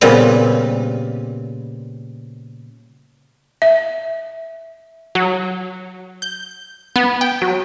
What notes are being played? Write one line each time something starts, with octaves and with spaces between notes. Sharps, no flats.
A#2 C#3 G3 B3 C4
E5
F#3
G6
B3
G5
F#3